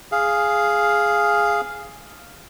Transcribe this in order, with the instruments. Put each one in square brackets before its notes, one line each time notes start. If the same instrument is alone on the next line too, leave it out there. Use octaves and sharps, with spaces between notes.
[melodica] G#4 F5